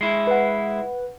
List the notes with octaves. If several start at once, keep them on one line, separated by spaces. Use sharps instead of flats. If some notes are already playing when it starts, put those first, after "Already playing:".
G#3 E4
B4 F#5